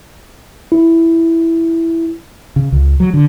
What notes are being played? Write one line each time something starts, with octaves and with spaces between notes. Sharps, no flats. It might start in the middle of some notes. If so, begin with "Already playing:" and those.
E4
C#3
C#2
F#3
D3